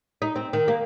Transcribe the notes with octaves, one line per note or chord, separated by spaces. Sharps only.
D#4
C4
D#3
A#3